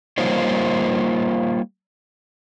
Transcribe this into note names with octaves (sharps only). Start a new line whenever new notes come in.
G3 A#3 D#4 F4 C5 C#5